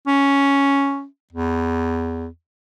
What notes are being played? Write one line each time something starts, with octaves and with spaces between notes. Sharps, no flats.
C#4
E2